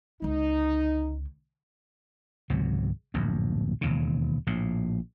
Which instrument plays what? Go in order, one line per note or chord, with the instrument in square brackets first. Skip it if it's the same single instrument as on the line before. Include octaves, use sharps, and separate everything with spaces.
[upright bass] C#2 D3 [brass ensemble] D#4
[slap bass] G#1 C#2 C3 F#3
D1 A#1 F#2
E1 D#2 C#3
A#1 A2